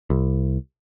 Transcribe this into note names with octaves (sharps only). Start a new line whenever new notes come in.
C2